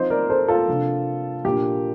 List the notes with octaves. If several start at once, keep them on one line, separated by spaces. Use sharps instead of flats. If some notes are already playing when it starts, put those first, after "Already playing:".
Already playing: F3 C4 D#4 C5 D#5
A#4 D5
A4 C5
F4 A4
C3 F3 A#3 D4
A#2 F3 A#3 D4 G4